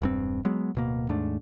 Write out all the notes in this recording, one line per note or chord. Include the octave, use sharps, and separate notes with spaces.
E1 G2 C4
F#3 G#3 B3
D1 B2 A#3
D#2 G#2 A3 D4